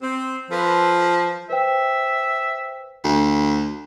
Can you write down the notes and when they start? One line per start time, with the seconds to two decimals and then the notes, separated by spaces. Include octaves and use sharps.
0.02 C4
0.51 F3 F4 A4 B4
1.50 B4 C5 E5 G5
3.04 D2